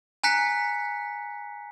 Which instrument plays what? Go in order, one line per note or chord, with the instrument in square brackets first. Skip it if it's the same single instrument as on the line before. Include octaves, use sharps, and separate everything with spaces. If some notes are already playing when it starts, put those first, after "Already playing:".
[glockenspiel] G#5 A#5 F#6 B6 C#7